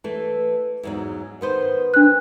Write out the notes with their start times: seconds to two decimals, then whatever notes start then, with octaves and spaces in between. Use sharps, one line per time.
0.04 E3 A3
0.83 E2 G#2 F#3
1.41 D#3 B3 C5
1.94 D4 F#6